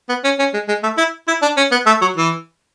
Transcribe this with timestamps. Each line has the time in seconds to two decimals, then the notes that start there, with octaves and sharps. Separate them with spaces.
0.09 B3
0.24 C#4
0.39 C#4
0.53 G#3
0.68 G#3
0.83 A3
0.98 E4
1.28 E4
1.42 D4
1.57 C#4
1.71 B3
1.86 A3
2.01 F#3
2.17 E3